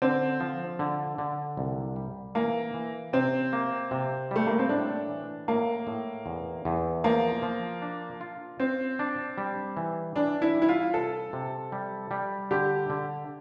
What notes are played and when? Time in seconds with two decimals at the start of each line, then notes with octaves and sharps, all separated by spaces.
0.02 D3 C4
0.40 F3
0.79 D3
1.18 D3
1.57 C2
1.96 G3
2.35 E3 A#3
2.74 E3
3.13 C3 C4
3.53 A#3
3.91 C3
4.31 G3 A3
4.47 A#3
4.59 C4
4.69 A2 D4
5.09 E3
5.48 A2 A#3
5.87 A2
6.26 E2
6.65 E2
7.04 F3 A#3
7.43 F3
7.82 D4
8.21 F4
8.60 C4 F4
8.99 D4
9.38 G3
9.77 E3
10.16 E3 D4
10.42 E4
10.55 G3
10.62 E4
10.69 F4
10.94 C3 A4
11.33 C3
11.72 G3
12.11 G3
12.51 D3 G4
12.90 D3